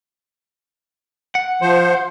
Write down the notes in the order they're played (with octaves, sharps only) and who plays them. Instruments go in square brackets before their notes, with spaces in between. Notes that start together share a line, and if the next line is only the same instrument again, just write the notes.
[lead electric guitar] F#5
[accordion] F3 C5